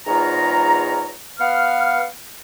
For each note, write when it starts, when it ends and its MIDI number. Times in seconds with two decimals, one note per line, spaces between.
0.06 1.11 40
0.06 1.11 44
0.06 1.11 65
0.06 1.11 73
0.06 1.11 82
1.39 2.03 59
1.39 2.03 77
1.39 2.03 78
1.39 2.03 89